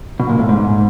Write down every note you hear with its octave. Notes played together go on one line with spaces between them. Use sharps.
B2
A#2
A2
G#2